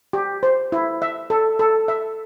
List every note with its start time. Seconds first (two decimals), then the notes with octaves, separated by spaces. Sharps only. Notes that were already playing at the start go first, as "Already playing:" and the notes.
0.13 G4
0.43 C5
0.72 E4
1.02 E5
1.30 A4
1.59 A4
1.88 E5